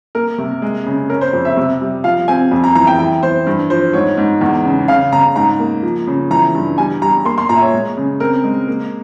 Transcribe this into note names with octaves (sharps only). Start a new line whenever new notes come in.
A#3 A#4
C3
G#3
C#3
C#4 A#4
C5
F2
E5
C3
G3
F3 F5
C4 G#5
F2
A#5
E3 A#5
G5
E3 G5
E3 C5
G2
F3 C5
G#2 C#5
G#2
E2
C#3
C#3 F5
C#3 A#5
G#2 A#5
A#3
F3
C#3
E3 A#5
G2
G3 G#5
G3 A#5
A#3 C6
C6
A#2 A#5
E5
C#5
G#3
C#3
C4 A#4
G#3
A#3